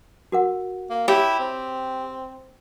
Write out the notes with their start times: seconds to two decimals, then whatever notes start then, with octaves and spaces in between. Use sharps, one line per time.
0.32 F#4 A#4 F#5
0.90 A#3
1.08 E4 G4 C#5
1.39 C4